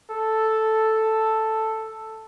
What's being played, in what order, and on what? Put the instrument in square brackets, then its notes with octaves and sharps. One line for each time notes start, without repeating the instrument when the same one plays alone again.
[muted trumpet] A4